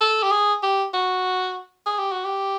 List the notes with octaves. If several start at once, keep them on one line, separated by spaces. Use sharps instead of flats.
A4
G4
G#4
G4
F#4
G#4
G4
F#4
G4